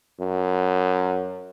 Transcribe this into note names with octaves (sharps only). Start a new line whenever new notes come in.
F#2